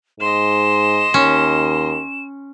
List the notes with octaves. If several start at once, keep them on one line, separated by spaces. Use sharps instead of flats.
G#2 D#5 C6 E7
D#2 C#4